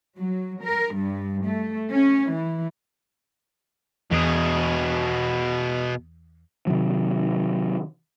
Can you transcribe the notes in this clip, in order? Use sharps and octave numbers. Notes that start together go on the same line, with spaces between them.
F#3
A#4
G2
A3
C#4
E3
E2 B2 G#4
C3 D#3 F#3